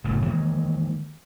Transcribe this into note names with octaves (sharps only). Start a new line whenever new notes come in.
F#1 A2 C#3 A3
D#3 E3 G#3 A#3